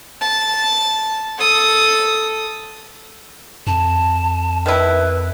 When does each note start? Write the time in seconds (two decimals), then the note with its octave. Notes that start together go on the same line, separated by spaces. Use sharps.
0.21 A5
1.38 A4 D#6
3.67 F2 A5
4.66 D#3 E4 B4